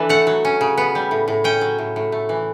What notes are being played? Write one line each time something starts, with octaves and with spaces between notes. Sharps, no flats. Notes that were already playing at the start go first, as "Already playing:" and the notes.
Already playing: E3 D4 A4 B4
A3 F#5
F#3
C#4
C#3
B3
G3
A2
A2
C#4 G5
F#3
A2
A2
A3
E3